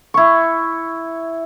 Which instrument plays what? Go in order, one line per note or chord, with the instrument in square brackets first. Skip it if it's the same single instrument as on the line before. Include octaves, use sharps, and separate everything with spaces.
[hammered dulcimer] E4 C#6